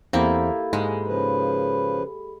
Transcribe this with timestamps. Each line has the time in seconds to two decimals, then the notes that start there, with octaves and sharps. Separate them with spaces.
0.13 E2 A#3 C4 E4 G4 A4 B5
0.73 G#2 G#3
1.07 C#3 F3 B4